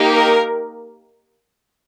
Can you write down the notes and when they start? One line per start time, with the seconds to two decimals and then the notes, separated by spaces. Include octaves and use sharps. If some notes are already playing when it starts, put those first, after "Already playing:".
Already playing: A#3 D#4 G4
0.12 A#4